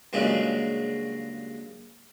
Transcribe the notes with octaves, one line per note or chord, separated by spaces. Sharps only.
G2 A#2 C#3 F#3 G#3